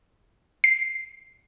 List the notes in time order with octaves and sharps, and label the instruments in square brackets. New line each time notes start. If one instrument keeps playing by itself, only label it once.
[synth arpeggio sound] C7